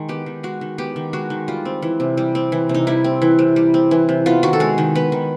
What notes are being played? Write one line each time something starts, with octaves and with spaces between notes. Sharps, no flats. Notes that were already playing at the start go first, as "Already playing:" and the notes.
Already playing: D#3 G#3
B3 G4
D#3
G#3 F#4
D#3
B3 G4
D#3
G#3 F#4
D#3
G3 F4
C4
E3
C3
G3
C4
E3
C3
D#4
G3 E4
C4
E3
C3
G3
C4
E3
C3
B3 F4
D#3 F#4
A4
G#3 G#4
D#3
B3 B4
D#3